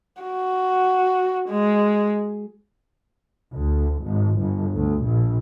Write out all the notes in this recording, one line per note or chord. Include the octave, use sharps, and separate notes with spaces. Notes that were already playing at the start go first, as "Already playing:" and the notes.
F#4
G#3
D2
G#1
G1
D2
A#1